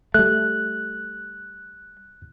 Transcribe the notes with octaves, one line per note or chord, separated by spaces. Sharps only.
G3 A3 F#6